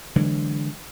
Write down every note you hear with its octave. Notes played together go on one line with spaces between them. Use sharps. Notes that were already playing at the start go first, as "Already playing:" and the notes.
D3 E3 F#3 G#3